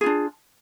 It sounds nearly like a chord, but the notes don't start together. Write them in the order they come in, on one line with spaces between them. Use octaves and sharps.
G#4 F4 D4